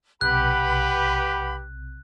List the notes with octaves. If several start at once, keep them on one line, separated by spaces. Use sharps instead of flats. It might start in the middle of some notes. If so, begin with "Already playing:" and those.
B1 C3 G4 B4 F#5 B5 F#6